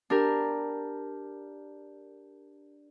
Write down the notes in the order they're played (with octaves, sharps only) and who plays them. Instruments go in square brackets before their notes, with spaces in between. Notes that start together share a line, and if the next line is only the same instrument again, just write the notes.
[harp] D4 G4 A#4